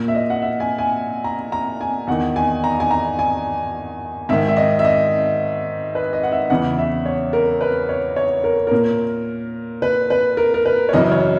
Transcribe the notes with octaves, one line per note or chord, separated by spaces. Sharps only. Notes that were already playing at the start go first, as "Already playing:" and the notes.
Already playing: A#2
E5
D#5
F#5
E5
G#5
G#5
A#5
A#5
G#5
E2 D#3 F#5
G#5
A#5
G#5
A#5
G#5
G#2 D#3 E5
E5
D#5
E5
D#5
B4
D#5
F#5
E5
E2 C#3 E3 F#5
E5
C#5
A#4
B4
C#5
C#5
A#4
A#2 A#4
B4
B4
A#4
A#4
B4
C#5
F#2 C#3 E3 D#5
C#5